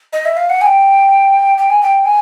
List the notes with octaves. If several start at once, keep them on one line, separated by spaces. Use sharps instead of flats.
D#5
E5
F5
F#5
G#5
G5
G5
G#5
G5
G#5